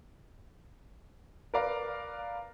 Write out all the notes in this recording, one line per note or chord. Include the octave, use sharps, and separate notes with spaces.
A#4 B4 D5 F5 A#5